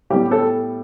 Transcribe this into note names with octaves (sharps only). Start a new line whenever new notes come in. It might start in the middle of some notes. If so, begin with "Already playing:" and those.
A2 G3 B3 G4
A4